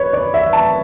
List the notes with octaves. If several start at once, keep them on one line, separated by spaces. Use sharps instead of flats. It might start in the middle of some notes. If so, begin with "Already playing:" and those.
Already playing: B4 C#5
D5
E5
A5